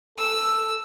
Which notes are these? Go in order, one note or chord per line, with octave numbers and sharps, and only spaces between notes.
A4 E6